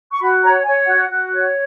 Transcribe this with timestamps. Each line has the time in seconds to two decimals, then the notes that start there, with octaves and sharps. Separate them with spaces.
0.12 C#6
0.21 F#4 B5
0.43 C#5 A#5
0.64 C#5 G#5
0.86 F#4 F#5
1.09 F#4
1.31 C#5